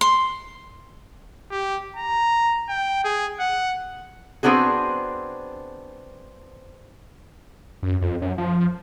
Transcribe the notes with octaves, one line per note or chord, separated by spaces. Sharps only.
C6
G4
A#5
G5
G#4
F#5
B3 C4 D4 F#4 G#4
F#2
F2
F#2
F3